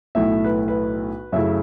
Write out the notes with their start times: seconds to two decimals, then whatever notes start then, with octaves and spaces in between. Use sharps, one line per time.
0.15 B1 A2 A3 E4 E5
0.45 B4
0.68 B4
1.32 F#2 C#3 A3 E4 E5